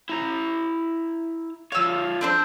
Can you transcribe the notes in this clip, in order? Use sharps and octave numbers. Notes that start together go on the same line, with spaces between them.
E4 A#5
F3 C#5 F5 E6
C4 D4 C5